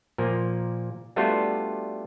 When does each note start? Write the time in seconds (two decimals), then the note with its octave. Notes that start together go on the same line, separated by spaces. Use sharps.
0.18 A#2 F3 A#3
1.16 G3 A3 B3 D4 F4 F#4